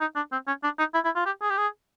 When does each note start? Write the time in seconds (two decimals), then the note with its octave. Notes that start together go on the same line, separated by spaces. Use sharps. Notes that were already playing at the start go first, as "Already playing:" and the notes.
0.01 D#4
0.16 D4
0.32 C4
0.48 C#4
0.64 D4
0.79 D#4
0.94 E4
1.05 E4
1.16 F4
1.26 G4
1.42 G#4
1.50 G4
1.58 G#4